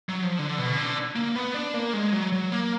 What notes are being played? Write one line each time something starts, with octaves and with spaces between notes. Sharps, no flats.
F#3
F3
D3
B2
D3
A#3
B3
D4
A#3
G#3
F#3
F#3
A#3